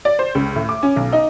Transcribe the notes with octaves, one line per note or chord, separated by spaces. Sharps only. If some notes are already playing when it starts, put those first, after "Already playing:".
D5
C5
C#2
A2
D6
C#4
B1
D#4